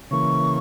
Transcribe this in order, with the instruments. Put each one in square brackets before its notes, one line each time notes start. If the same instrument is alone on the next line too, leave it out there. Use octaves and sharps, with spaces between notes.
[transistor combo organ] C#3 E3 A#3 [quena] C#6